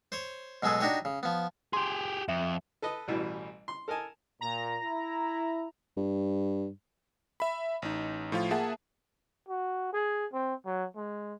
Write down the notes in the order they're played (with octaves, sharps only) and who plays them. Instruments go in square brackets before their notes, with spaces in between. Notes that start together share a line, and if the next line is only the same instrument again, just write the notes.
[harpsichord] C5 C#5
B2 F#3 G#3 G#4 A4
D4 D#4 F#4 G4 C#5
C#3
F3 B3
[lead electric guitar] G4 G#4 [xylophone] C6
[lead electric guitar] F2 [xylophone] E5
[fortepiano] A4 B4 D#5
A1 B2 E3 G3
C6
A4 A#4 D#5 G#5 A5
[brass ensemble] A#2 [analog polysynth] A#5
[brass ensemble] E4
[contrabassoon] G2
[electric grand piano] E5 B5
A1 D#4
A2 F3 F4
A#3 G#4 E5 F#5 A5
[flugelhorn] F#4
G#4
C4
F#3
G#3